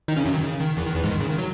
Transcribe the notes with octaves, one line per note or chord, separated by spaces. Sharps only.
D#3 D#4
C#3 C#4
F#2 F#3
D#3
C#3
D#3
E2 E3
D#3
E2 E3
G#2 G#3
D#3
C#3
D#3
F#3